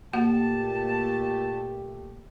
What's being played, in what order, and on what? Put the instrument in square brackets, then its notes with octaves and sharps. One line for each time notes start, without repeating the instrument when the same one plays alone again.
[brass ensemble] A#2 A3 G4 [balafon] A#3 F#4 F#5 [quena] A5